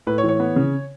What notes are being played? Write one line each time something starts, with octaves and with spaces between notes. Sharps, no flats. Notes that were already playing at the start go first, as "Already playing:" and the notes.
A2 B4
C#5
E3
C#5
B3
C#3